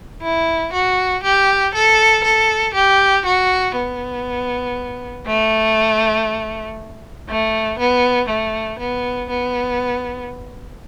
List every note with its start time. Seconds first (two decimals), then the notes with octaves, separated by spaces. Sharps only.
0.22 E4
0.73 F#4
1.23 G4
1.74 A4
2.24 A4
2.74 G4
3.25 F#4
3.76 B3
5.27 A3
7.29 A3
7.79 B3
8.29 A3
8.79 B3
9.30 B3